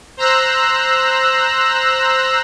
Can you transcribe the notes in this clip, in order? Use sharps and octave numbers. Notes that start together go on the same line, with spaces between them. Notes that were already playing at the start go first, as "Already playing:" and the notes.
C5 A#5 E6 F#6